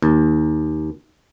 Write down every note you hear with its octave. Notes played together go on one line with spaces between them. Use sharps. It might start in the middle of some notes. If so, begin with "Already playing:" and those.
D#2